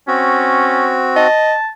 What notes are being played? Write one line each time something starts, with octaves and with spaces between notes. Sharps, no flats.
C4 C#4 F#4
D#5 A5